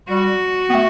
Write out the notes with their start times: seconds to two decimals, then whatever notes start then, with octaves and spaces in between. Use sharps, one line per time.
0.08 G3 F#4
0.69 B3
0.74 A3